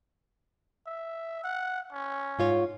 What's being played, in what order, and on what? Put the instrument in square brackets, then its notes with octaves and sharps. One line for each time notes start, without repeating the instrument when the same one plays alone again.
[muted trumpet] E5
F#5
C#4
[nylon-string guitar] G#2 F4 C#5